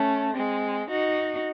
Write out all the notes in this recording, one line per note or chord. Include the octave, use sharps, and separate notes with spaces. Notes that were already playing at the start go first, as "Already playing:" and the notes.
Already playing: A3 C#4
G#3 C4
D#4 F#4